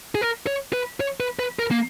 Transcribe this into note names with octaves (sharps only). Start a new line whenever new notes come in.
G#4
A#4
C#5
B4
C#5
B4
B4
A#4
A#3